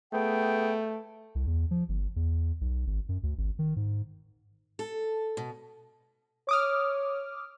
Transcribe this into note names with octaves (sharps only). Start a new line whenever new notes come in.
A3 B3 G#4 G5
C2
E2
F3
G1
E2
B1
G#1
F#2
D2
G#1
D#3
G#2
A4
B2
C#5 D6 D#6 F6